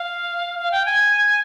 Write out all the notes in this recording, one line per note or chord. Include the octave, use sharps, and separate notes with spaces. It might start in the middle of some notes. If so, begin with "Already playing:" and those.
Already playing: F5
F5
G5
G#5